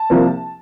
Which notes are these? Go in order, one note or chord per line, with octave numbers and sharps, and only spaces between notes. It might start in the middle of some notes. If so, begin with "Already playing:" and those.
Already playing: A5
C2 C3 F3 A#3